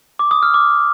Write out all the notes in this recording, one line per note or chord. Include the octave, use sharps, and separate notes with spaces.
D6
D#6
F6
D6